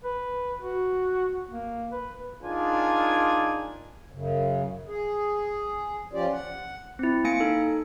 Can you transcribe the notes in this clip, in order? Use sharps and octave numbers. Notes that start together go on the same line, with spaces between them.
B4
F#4
A#3
B4
D4 D#4 F4 G#4 A#4 G#5
F#2 C#3
G#4
F3 C#4 F4 G4 D5
F#5
C4 E4
A#3 G#5 A#6 C#7 D7
D#4 A4